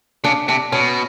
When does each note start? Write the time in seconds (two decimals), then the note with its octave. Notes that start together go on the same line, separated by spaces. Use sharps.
0.24 C#3 D4
0.48 C3 D4
0.72 B2 C#4